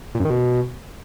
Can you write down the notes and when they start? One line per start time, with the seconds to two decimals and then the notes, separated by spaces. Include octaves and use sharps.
0.15 A#2
0.20 F#2
0.25 D#3
0.30 B2